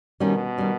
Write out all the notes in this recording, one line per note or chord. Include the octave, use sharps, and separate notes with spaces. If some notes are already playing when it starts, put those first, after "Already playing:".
B2 D#3 G3 C#4
D#3 G3 C#4